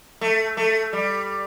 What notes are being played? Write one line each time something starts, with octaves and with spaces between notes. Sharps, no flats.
A3
A3
G3